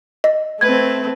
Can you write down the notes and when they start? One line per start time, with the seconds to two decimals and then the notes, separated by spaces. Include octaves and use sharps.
0.24 D#5
0.61 A3 C4 B4 G#6